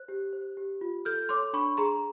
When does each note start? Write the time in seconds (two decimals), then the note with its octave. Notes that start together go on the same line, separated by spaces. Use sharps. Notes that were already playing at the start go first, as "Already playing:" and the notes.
Already playing: C5 F#6
0.08 G4
0.33 C5
0.57 G4
0.81 F4
1.05 A4 F6 G6
1.29 C#5 C6 D6
1.53 D4 B5 C#6
1.77 G#4 A#5 C6